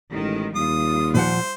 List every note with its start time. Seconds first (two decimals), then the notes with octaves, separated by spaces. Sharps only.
0.11 A1 D#3 G#3
0.56 D#2 G3 F4 D#6
1.14 A#2 F3 C5 F#5